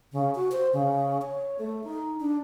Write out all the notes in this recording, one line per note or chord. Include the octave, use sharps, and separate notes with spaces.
C#3
F#4
C5
C#3
C#5
A3
D#4
D4